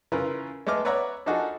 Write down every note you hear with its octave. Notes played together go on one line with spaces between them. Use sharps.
C#3 E3 F4 A#4 B4
G#3 A3 B3 D6 F6
B4 C#5 D5 E5 F#5 A#5
F3 D4 D#4 F#4 G#4 A4